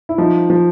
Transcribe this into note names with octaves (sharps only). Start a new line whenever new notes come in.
E4
F3 D#4
F3